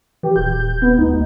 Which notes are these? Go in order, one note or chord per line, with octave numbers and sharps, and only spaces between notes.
E3 G4
D#1 G6
B3
D2 D#4
D#2